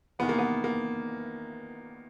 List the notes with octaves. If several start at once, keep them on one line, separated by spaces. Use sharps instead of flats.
E2 C3 D#3 B3
A#3
B3
A#3